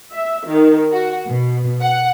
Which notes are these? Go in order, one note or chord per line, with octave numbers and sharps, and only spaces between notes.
E5
D#3
F#4
B2
F#5